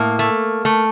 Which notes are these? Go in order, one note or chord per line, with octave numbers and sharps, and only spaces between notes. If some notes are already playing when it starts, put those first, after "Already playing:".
Already playing: A2 A#3
A3
A3